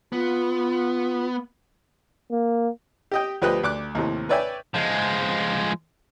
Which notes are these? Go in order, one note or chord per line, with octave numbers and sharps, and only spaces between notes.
B3 F4
A#3
G4 D#5 G5
D2 F3 G4 B4 D#5 F#6
D2 D6 F#6
D#2 A2 C3
B4 C#5 D5 E5 G5 G#5
F3 G#3